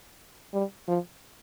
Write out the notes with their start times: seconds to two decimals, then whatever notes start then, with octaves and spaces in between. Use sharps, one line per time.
0.53 G3
0.88 F3